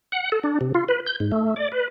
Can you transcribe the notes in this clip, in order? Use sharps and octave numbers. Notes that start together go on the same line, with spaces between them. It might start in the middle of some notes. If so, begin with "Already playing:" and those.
F#5
A4
D4
C3
F4
B4
G6
G#2
A3
D5
B4